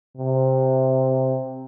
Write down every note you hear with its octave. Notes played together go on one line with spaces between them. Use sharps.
C3